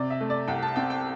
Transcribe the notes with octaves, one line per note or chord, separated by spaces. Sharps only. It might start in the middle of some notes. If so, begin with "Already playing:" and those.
Already playing: C3 D5
E5
A3
D5
C2 G5
A5
C4 G5
G5